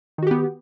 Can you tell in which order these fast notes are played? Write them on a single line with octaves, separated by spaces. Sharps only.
D#3 F#4 G4 B3